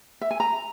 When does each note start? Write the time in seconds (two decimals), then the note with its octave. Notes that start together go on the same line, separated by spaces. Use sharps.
0.21 E5
0.31 G#5
0.40 A#5